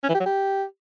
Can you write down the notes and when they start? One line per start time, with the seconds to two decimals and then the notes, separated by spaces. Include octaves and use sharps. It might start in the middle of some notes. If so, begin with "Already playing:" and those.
0.03 C#4
0.09 E3
0.15 G4
0.20 F#3
0.26 G4